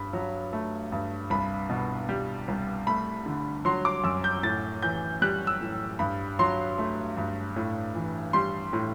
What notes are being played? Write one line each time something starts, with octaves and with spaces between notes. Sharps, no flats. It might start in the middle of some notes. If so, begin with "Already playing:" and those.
Already playing: G2 B5
F#3
A3
G2
C2 B5
B2
G3
C2
A3 B5
D3
F#3 C6
D6
F#2 E6
G6
A2 A6
E3 G6
G3 F#6
E6
A2
G2 B5
F#3 C6
A3
G2
A2
E3
G3 C6
A2